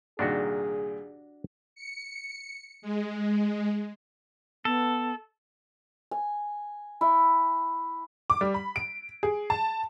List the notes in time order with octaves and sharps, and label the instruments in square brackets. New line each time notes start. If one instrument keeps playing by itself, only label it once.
[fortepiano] C2 A#2 D#3 [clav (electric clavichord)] D4 F#4 [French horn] G#4
[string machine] C#7
G#3
[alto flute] B3 [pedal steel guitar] A4
[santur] G#5
E4
[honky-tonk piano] D6
G3
B5
D7
G#4
A5